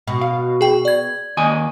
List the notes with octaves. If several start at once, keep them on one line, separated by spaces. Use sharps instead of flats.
B2
F5
G#4 G5
D5 G#6
D#2 D#5 G#5